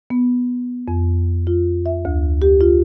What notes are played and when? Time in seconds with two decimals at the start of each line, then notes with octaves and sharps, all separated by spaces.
0.10 B3
0.88 F2
1.47 F4
1.86 E5
2.05 D2
2.42 G4
2.61 F4